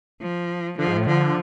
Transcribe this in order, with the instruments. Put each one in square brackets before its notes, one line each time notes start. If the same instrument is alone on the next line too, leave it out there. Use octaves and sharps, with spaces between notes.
[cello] F3
[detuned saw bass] D3 [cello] F3
[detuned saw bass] G#2
A2
[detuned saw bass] D3 [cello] F3